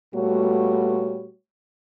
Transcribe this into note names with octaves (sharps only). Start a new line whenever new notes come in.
A#2 G3 A3 B3 F#4 C#5